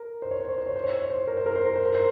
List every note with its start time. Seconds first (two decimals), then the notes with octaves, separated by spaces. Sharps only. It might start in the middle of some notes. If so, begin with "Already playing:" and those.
Already playing: A#4
0.22 C5
0.31 C#5
0.40 C5
0.49 C#5
0.58 C5
0.66 C#5
0.76 C5
0.84 C#5
0.93 C5
1.02 C#5
1.10 C5
1.27 A#4
1.37 C5
1.46 A#4
1.55 C5
1.65 A#4
1.76 C5
1.85 A#4
1.95 C5